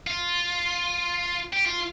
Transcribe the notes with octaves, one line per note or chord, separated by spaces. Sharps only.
F4
G4
F4